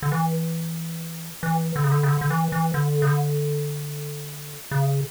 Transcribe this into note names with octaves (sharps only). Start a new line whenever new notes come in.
D3
E3
E3
D3
C#3
D3
C#3
D3
D3
E3
E3
D3
C#3
D3
C#3